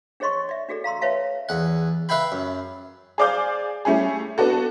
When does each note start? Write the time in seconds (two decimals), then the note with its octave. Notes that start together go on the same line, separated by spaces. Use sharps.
0.20 D4 G#4 C#5 D#5 C6 C#6
0.49 D5 E5
0.69 D4 F#4 G#4 A4 D5
0.84 F5 A#5 C6 E6
1.01 B4 C#5 E5 F5 A5
1.49 E2 F#5
2.09 B4 E5 F5 G5 B5
2.32 F#2
3.18 G#4 C5 D5 F5 D6 G6
3.85 G3 A3 C#4 E4 G#4
4.38 B3 D4 F#4 A4